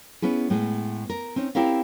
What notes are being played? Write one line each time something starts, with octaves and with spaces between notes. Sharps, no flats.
B3 C#4 E4 G#4
A2 G#3 B3 G#4
A#4
C4 C#4 D#4
C4 E4 G4 A#4 C#5 F5